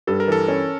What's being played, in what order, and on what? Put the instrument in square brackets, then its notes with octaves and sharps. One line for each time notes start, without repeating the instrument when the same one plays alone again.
[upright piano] G2 [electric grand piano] A4
[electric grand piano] A#4
[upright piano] E3 [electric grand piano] A4
[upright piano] C#4